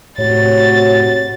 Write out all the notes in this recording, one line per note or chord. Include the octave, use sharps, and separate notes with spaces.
A2 C3 F#4 C#5 A6